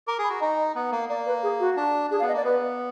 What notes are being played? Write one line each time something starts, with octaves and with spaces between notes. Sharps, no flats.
A#4 D6
G#4
B5
F#4
D#4 D#5
B3
A#3
A#3 D5
B4
G#4
F#4
D4
D4 G#4
F5
B3
D#5
A#3 D5
B3 B4